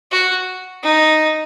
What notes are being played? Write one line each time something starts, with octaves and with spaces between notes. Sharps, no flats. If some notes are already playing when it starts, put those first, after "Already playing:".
F#4
D#4